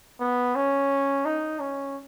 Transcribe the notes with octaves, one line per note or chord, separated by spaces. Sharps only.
B3
C#4
D#4
C#4